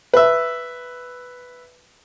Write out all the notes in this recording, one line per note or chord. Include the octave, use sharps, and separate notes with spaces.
B4 E5